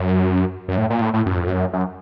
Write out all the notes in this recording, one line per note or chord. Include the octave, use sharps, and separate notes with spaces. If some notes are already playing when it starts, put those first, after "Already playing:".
Already playing: F#2
F#2
A2
A#2
A2
A2
F#2
F2
F#2
F#2